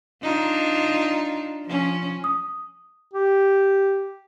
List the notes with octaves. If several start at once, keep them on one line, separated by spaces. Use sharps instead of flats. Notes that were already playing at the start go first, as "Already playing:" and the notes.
D4 D#4 F4
F3 C#4
D#6
G4